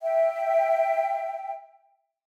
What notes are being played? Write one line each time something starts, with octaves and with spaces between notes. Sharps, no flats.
E5 G5